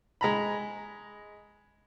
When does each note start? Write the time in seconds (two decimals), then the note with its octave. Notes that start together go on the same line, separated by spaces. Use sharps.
0.21 G#3 A#5 B5